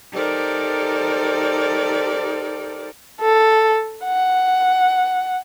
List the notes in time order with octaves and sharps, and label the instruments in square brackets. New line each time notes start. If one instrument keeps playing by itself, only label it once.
[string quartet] D#4 G4 A4 A#4 C5 D5
[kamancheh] A4
F#5